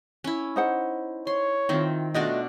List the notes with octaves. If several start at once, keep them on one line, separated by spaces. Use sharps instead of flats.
C#4 E4
D#4 C5 F#5
C#5 C6
D#3 C4 E4 F4
B2 A3 D4 F4 F#4 D5 D#5